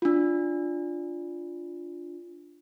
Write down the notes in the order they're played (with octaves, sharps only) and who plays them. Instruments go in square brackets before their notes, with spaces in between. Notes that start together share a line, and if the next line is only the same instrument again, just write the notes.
[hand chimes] D4 F4